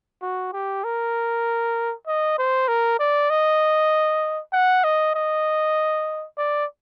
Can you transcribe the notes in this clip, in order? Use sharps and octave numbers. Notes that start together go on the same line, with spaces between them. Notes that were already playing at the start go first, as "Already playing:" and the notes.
F#4
G4
A#4
D#5
C5
A#4
D5
D#5
F#5
D#5
D#5
D5